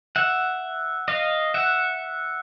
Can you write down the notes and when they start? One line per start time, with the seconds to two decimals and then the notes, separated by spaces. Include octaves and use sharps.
0.16 E5 F#5
1.08 D#5 F5
1.54 E5 F#5